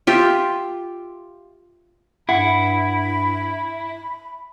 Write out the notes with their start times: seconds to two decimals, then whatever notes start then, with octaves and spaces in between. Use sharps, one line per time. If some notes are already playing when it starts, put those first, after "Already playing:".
0.07 F4 G4 E5
2.29 G2 E4 F#5 B5